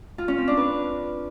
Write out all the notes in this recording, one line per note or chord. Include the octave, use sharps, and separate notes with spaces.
F4
C#4
C4
D4
B4